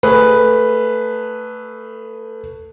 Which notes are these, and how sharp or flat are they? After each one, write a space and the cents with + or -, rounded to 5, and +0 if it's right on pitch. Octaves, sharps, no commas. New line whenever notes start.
A3 +20 G#4 +0 B4 +0